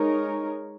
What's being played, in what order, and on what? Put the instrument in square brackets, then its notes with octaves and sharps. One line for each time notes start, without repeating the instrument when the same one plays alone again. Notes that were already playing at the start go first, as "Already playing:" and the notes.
Already playing: [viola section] G#3 D#4 A#4 C#5